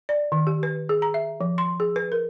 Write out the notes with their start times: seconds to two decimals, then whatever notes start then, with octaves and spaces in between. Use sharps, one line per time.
0.09 D5
0.32 D#3
0.47 G4
0.63 B4
0.89 G#4
1.02 A#5
1.14 E5
1.41 F3
1.58 C6
1.80 G#4
1.96 B4
2.12 A#4